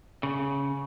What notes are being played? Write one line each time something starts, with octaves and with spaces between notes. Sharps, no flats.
C#3